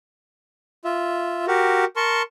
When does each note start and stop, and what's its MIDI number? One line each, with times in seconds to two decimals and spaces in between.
0.85 1.45 65
0.85 1.45 76
1.48 1.85 66
1.48 1.85 67
1.48 1.85 70
1.96 2.22 70
1.96 2.22 81
1.96 2.22 84
1.96 2.22 85